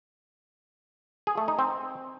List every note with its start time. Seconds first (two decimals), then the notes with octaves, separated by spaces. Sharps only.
1.27 G#4
1.38 A3
1.48 D#4
1.59 C4